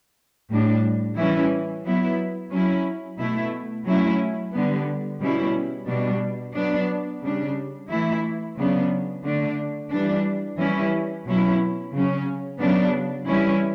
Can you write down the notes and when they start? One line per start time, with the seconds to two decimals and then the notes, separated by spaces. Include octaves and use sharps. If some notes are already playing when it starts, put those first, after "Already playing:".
0.50 A2 G3 D4
1.17 E3 G3 C#4 E4
1.84 F#3 B3 E4
2.51 F#3 C#4 E4
3.19 B2 A3 E4
3.86 F#3 A3 C#4 E4
4.53 D3 G3 B3
5.20 B2 G3 C#4 E4
5.88 B2 G3 D4
6.55 F#3 B3 D4
7.22 C#3 G3 D4
7.89 E3 A3 E4
8.56 C#3 F#3 B3 D4
9.24 D3 A3 D4
9.90 E3 G3 D4
10.58 E3 G3 C#4 E4
11.25 B2 F#3 C#4 E4
11.93 C#3 F#3 C#4
12.60 C#3 F#3 B3 D4
13.28 E3 G3 C#4 E4